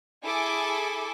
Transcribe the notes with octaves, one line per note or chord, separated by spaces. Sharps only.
E4 G#4 A4 G#5 D6